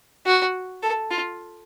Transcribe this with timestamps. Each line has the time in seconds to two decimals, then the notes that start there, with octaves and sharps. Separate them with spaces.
0.26 F#4
0.82 A4
1.11 F4